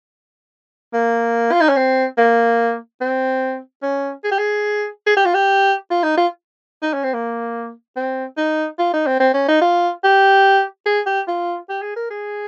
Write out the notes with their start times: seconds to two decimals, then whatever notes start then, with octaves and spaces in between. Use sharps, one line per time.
0.94 A#3
1.52 F4
1.61 D#4
1.69 C#4
1.77 C4
2.18 A#3
3.01 C4
3.83 C#4
4.24 G#4
4.31 G4
4.39 G#4
5.07 G#4
5.17 G4
5.25 F4
5.34 G4
5.90 F4
6.04 D#4
6.17 F4
6.83 D#4
6.94 C#4
7.04 C4
7.13 A#3
7.96 C4
8.37 D#4
8.79 F4
8.94 D#4
9.07 C4
9.20 C4
9.34 C#4
9.48 D#4
9.61 F4
10.04 G4
10.86 G#4
11.06 G4
11.28 F4
11.69 G4
11.82 G#4
11.96 A#4
12.11 G#4